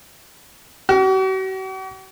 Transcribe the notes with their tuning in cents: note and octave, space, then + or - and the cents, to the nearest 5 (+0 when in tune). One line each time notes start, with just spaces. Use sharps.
F#4 +45